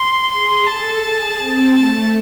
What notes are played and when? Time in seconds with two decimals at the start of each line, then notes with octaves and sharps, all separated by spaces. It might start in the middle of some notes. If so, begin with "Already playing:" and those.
Already playing: C6
0.31 G#4 C6
0.67 A4 A5
1.04 G#4
1.39 C4
1.76 A3 A5